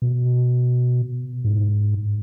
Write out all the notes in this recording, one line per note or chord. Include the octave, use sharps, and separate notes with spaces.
B2
G#2